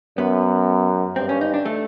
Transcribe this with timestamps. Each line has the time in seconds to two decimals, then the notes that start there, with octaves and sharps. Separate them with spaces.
0.18 F#2 B3
1.16 G2 C4
1.29 C#4
1.41 D#4
1.54 D4
1.65 A3